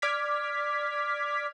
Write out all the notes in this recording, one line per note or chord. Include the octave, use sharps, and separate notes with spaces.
D5 D6 F6 G#6 B6